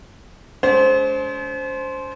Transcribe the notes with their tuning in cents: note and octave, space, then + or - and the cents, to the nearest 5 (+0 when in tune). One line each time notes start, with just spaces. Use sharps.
G#3 +35 C#4 +45 C5 +0